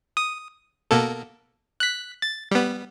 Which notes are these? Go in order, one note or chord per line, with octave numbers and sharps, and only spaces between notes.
D#6
B2 A#3 A4
F#6 B6
A6
G3 B3